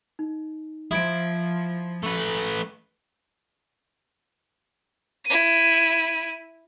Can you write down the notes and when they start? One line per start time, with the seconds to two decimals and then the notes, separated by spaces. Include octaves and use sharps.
0.19 D#4
0.91 F3 E4 D#6 G#6 D7
2.03 A3 B4
5.25 E4 D#7